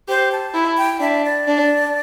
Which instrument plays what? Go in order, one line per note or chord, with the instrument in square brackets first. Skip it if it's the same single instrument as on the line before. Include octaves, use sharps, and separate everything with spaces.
[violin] G4 [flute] C5
[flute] A5
[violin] E4
[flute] G5
[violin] D4 [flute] E5
[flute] D5
[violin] D4